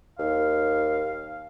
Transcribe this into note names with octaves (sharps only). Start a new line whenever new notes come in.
D#2 F5